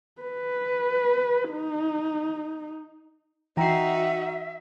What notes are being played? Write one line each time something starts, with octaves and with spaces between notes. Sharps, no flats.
B4
D#4
E3 D#4 F#4 E5 G5 A#5 C7